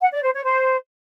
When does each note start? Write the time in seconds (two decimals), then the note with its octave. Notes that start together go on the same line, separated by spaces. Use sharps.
0.01 F#5
0.12 D5
0.23 C5
0.34 C#5
0.45 C5